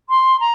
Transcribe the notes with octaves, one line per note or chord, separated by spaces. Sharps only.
C6
A#5